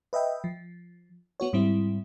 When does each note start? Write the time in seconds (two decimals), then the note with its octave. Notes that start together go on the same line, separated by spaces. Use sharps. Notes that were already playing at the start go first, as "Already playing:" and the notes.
0.13 B4 D#5 E5 G5
0.44 F3
1.40 B3 F#4 C#5
1.53 G#2 G3 C4 E4